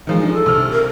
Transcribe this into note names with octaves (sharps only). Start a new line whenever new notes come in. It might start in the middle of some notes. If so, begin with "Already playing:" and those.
D#3 F3 G#3
D4
A4
C2 F6
A#4